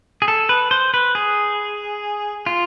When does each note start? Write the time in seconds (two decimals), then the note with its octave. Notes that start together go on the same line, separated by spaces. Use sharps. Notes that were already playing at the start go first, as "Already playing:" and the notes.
0.22 G#4
0.28 A4
0.49 B4
0.71 C5
0.94 B4
1.15 G#4
2.46 F4